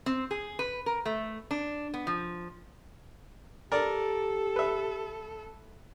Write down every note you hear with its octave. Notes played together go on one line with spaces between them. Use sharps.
C4
G#4
B4
A#4
A3
D4
B3
F3
G4 A4 A#4 D5
B4 E5